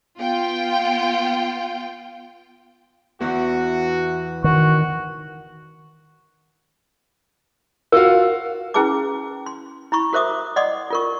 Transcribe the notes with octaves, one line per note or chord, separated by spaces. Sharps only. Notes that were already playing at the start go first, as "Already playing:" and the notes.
B3 F4 G5
E2 E3 F#4
D#3 F#4
F4 F#4 A#4 F5
C#4 E4 G#4 B4 A5 D6
C6
E4 B5 C#6
F#4 A#4 C5 E5 D6 D#6
D5 D#5 F#5 C6 D6 D#6
F4 A#4 C#6